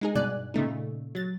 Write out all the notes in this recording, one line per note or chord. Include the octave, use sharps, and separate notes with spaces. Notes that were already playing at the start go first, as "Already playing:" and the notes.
G#3 D#4 G#4
G2 B2 D5 G#5 F#6
A#2 C#3 A3 D#4
F#3 A6